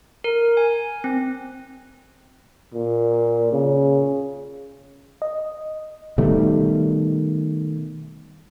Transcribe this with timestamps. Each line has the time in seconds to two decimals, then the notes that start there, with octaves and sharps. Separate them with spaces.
0.24 A#4
0.57 G#5
1.04 C4
2.74 A#2
3.52 C#3
5.22 D#5
6.18 B2 D#3 G3 A3